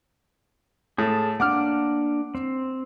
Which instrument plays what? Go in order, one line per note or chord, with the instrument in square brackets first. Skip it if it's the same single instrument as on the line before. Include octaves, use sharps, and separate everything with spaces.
[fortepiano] A2 [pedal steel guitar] G#4 A5
[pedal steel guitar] A#3 D4 [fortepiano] F#5 D6 F6
[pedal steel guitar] C4